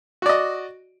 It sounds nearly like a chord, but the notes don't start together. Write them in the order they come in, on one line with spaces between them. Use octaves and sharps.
F#4 D5 D#5